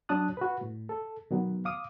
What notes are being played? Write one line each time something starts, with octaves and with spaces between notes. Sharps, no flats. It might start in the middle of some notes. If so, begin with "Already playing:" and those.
F#3 D4 C#5 A5 D#6 F#6
F#4 B4
A2
A4
B2 D#3 F#3 B3
F5 D6 D#6